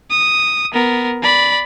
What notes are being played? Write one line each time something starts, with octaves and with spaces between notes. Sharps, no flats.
D#6
B3 A#4
D5 B5